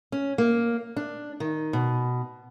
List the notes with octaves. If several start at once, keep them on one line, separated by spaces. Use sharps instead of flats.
C#4
A#3
D4
D#3
B2